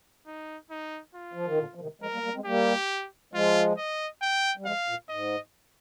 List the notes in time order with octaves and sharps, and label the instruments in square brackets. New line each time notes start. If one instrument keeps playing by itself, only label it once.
[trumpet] D#4
D#4
F4
[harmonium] F3
D#3
A#2 D3
F3
C3 D#3
[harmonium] F3 G#3 [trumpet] A#4
[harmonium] G3 A#3
G3 A#3
G#3 C4
[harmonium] G3 A#3 [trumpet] G4
[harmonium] F3 G#3 [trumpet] F4
[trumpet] D#5
G5
[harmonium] G3
[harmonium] F3 G#3 [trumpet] F5
[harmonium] A#2
[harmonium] G#2 [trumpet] D#5